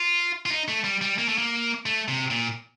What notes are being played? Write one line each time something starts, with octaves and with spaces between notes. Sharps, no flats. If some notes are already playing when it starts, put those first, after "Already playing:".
Already playing: F4
F4
D#4
A3
G3
G3
A#3
A3
A#3
A3
C3
A#2